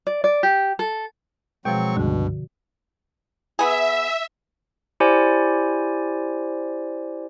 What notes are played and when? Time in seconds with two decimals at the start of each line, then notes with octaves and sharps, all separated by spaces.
0.07 D5
0.24 D5
0.43 G4
0.79 A4
1.65 B2 F3 F#3 G#3 C4 G5 C#6
1.97 C#2 G2 B2 D3 F#4
3.59 B3 G#4 E5
5.00 E4 G4 C5 D5 G#5